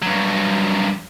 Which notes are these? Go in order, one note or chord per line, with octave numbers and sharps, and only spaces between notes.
G2 F#3